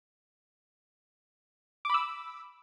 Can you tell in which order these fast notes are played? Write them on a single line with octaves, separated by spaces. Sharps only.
D6 B5 E6